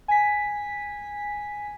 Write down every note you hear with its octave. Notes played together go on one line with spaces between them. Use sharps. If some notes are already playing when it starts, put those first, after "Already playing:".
G#5 B6